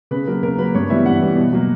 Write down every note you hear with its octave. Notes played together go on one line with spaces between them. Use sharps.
C#3 B4
F#3 A#3 A#4
C#3 A#4
F#3 A#3 B4
G2 C#5
E3 G3 B3 E5
G2 F#5
E3 G3 B3
B2
F#3 A#3